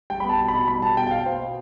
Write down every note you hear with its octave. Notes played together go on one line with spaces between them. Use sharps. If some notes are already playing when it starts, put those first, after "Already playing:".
G3 G5
B3 B5
A5
B2
B5
B2
G3 B5
B3 A5
B2 G5
G5
B2 F5
B3 C5
B2